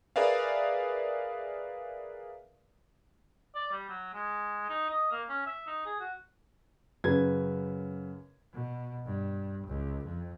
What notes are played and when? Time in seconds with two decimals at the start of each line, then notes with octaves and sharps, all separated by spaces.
0.16 G#4 A#4 B4 D5 E5 F5
3.55 D5
3.72 G3
3.89 F#3
4.13 G#3
4.69 D#4
4.90 D#5
5.11 A#3
5.29 C#4
5.46 E5
5.67 D#4
5.86 G#4
6.00 F#4
7.04 F#2 C#3 B4 G#6
8.53 B2
9.06 G2
9.67 C#2
10.04 F2